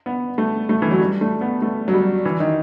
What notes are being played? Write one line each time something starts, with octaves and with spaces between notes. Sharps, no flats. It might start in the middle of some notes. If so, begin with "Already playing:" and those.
B3
A3
A3
E3
F#3
G3
A3
B3
A3
F#3
G3
E3
D#3